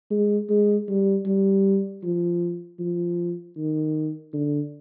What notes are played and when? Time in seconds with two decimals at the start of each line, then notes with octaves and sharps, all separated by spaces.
0.11 G#3
0.49 G#3
0.88 G3
1.26 G3
2.04 F3
2.80 F3
3.57 D#3
4.33 D3